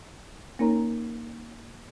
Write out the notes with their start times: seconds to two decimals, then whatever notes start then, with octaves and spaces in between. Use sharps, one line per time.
0.59 A#3 C#4 D#4 A#4 C#5 A#5